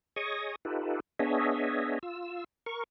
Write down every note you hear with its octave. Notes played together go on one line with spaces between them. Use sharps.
G#4 C#5 D#5 C#6 D#6
D#4 F4 G4 A4 B4
B3 D4 G#4 C#5 D#5 E5
F4 E6
A#4 C#6